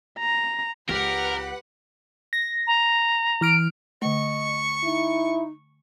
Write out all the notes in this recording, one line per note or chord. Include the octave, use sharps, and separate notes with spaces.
A#5
C#2 G4 A#4 B4 F#5
A#6
A#5
E3 F6 D7
D3 A3 D#5 C#6
D#4 E4